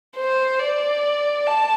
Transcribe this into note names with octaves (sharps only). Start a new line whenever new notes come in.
C5
D5
A5